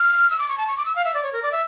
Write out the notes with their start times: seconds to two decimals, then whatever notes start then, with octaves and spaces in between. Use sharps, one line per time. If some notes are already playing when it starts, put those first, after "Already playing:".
Already playing: F6
0.30 E6
0.39 D6
0.48 C#6
0.58 A5
0.67 C#6
0.77 D6
0.85 E6
0.96 F5
1.05 E5
1.14 D5
1.23 C#5
1.33 A#4
1.43 D5
1.52 E5